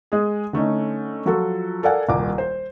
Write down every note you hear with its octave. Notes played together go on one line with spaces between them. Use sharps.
G#3 G#4
D3 A3 C#4 D#4
F3 F#3 F4 F#4 A4
A4 A#4 D5 F5 F#5 G#5
D#1 C2 D6
C5